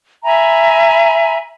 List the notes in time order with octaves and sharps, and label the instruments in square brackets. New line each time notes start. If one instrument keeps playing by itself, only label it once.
[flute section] E5 G#5 A#5 B5